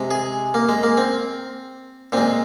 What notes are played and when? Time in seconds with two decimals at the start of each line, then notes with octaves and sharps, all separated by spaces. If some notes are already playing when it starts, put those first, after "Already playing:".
Already playing: C3 G#3
0.11 G#4
0.54 A#3
0.69 G#3
0.83 A#3
0.97 C4
2.12 A#2 G#3 C4